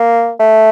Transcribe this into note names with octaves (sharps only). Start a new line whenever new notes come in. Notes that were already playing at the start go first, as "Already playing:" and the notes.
Already playing: A#3
A3